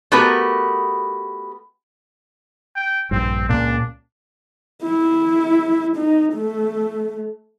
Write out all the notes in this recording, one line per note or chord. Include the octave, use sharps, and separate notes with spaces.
A3 B3 F#4 G4 A#4 B4
G5
A#1 G2 C4
C#2 A#2 C#3 D4
E4
D#4
A3